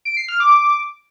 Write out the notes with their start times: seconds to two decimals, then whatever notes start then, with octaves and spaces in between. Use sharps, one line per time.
0.05 D7
0.17 C7
0.29 F6
0.40 D6